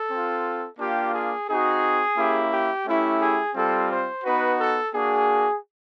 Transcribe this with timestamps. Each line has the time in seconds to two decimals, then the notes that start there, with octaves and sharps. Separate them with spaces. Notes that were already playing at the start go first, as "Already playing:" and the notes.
Already playing: A4
0.11 C4 F4
0.79 A#3 D4 F4 G4
1.14 G#4
1.48 C4 D#4 F#4 G#4
2.17 A#3 C#4 E4 G4
2.52 G4
2.86 A3 C#4 E4 G4
3.21 G#4
3.55 G3 C4 F4 A4
3.90 C5
4.24 B3 D#4 F#4 B4
4.59 A4
4.93 A#3 D4 F#4 G#4